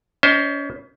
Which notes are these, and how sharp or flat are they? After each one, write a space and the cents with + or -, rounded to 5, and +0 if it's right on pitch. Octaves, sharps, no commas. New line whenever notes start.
C#4 +35 C5 +10 D#5 +20